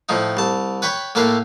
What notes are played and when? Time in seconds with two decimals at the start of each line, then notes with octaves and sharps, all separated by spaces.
0.09 A2 F3 D#4
0.37 C2 A5
0.82 B4 C#5 G5 B5 C#6
1.15 A2 A#3 A4 B4 F5